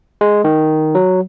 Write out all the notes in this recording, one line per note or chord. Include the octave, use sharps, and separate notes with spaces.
G#3
D#3
F#3